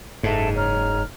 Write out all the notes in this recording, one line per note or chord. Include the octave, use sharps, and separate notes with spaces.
F#1 G#2 A4 E5 A5
C#5 A#5 F6